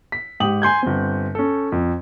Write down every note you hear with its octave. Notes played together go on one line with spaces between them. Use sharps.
B6
G#2 G4 G5 D#6 F#7
G#5 C6 G6 G#6
G1 C4
C#4 A4
F2